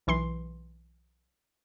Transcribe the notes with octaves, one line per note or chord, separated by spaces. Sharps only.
B1 E3 C6 C7